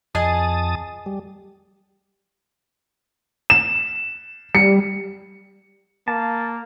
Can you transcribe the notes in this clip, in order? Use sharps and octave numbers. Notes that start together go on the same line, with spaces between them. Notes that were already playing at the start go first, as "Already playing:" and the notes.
F2 G#4 D#5 A5 D#6
G3
E7
G3 C#7
A#3 A5